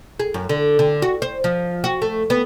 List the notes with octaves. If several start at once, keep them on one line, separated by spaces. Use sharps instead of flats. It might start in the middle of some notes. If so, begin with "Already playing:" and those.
G#4
F#2
D3
D3
F#4
C5
F3
F#4
A3
B3